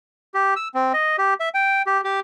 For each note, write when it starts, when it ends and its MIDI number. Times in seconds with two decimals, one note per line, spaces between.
0.34 0.54 67
0.56 0.68 88
0.74 0.93 60
0.93 1.16 75
1.18 1.34 67
1.40 1.49 76
1.54 1.82 79
1.87 2.01 67
2.05 2.20 67